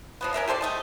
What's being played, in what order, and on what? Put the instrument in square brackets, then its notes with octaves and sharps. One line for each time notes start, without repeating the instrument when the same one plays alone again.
[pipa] F3 F#3 B3
C#4 A#4 E5 A#5
G4 A4 C5 D5
A3 D#4 A5